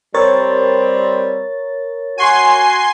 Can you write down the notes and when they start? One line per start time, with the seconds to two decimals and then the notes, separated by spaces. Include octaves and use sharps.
0.14 G3 C4 A#4 C#5 A6
2.18 F#4 G#5 C6 C7